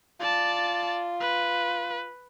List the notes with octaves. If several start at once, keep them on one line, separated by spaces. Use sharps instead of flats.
F4 D5 A5
B4